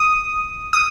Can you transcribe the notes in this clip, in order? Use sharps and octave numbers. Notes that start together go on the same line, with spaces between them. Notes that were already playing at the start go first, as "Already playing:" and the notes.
Already playing: D#6
D#6